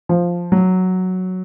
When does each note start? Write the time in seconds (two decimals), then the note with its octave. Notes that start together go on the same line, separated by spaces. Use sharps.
0.09 F3
0.52 F#3